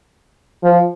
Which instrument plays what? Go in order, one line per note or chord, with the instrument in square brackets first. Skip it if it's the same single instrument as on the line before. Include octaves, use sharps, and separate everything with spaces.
[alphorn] F3